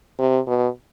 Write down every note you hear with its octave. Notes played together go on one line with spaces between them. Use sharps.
C3
B2